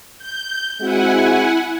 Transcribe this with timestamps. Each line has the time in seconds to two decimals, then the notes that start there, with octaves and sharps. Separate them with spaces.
0.18 G6
0.81 G#3 C4 E4 F#4 F#5 G#5